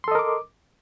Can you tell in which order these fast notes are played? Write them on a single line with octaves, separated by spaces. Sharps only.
C6 A4 D#5 A#4 D6